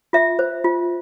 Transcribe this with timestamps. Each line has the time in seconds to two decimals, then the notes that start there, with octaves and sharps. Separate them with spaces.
0.13 F4 E5
0.39 C5
0.64 F4